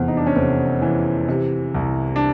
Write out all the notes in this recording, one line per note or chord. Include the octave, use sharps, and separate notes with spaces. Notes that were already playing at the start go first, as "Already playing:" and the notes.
Already playing: F1 E2 C4
D#4
D4
C#4
F1 C4
E3
C3
C2
D4